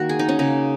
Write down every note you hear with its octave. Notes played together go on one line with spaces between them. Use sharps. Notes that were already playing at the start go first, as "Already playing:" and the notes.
Already playing: D#3 A#3 F#4
G#4
D#4
C#4
C#3 A#3 D#4